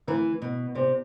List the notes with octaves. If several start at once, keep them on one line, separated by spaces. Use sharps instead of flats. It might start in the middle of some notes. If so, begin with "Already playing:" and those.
D3 E3 A3 C4 E4 B4
B2
C3 C4 G4 B4 D5